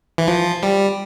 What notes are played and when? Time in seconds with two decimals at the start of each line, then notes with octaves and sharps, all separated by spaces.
0.18 E3
0.28 F3
0.63 G3